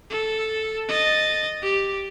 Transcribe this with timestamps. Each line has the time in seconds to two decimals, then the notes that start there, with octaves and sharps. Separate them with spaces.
0.10 A4
0.89 D#5 A6
1.63 G4